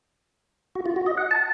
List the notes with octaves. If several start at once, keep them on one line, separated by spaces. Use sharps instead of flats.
F#4
F4
F#4
D#5
F#5
A5